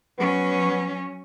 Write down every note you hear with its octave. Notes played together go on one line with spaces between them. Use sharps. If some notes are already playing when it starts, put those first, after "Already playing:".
F#3 B3 C#4